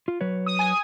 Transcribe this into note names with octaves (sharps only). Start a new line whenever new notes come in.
F4
F#3 B4 C#5
D#6
G#5 D#6